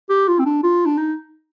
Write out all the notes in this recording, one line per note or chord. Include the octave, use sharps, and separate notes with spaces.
G4
F4
C4
D4
F4
D4
D#4